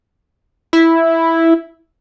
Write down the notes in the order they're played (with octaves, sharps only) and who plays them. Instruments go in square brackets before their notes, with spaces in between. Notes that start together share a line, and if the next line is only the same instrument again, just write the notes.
[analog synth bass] E4